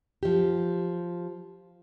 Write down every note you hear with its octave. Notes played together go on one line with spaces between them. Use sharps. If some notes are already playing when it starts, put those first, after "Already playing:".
F3 G4